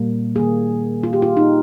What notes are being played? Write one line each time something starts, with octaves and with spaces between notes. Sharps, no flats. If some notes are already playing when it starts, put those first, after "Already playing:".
Already playing: A#2 G3 A#3
D#3 G3 A#3 G#4
F4
G4
F4
D#4